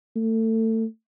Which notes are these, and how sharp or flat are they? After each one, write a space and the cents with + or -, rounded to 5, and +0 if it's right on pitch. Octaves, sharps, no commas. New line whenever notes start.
A3 +25